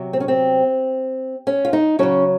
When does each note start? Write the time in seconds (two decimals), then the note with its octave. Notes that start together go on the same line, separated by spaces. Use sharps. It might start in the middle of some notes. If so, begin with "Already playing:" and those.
Already playing: C3 F#3
0.13 C4
0.20 C#4
0.28 C4
1.47 C#4
1.65 F4
1.73 D#4
1.99 C#3 F#3 C#4